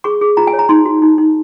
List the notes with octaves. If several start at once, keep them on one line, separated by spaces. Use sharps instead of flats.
G#4 C#6
G#4
F4 A#5
G#5
C#5
A#5
D#4 C6
F#4
D#4
D#4